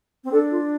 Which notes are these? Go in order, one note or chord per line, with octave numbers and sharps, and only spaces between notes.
C4
D4 A4
F4